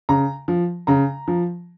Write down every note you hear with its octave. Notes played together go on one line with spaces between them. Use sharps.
C#3 A#5
F3
C#3 A#5
F3